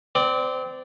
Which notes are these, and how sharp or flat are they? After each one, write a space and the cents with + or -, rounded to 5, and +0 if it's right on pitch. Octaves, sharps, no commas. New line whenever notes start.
C4 -25 D5 +0